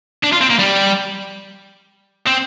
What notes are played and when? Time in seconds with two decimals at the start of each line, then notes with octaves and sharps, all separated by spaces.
0.23 D4
0.32 F4
0.41 C4
0.50 A#3
0.59 G3
2.27 C4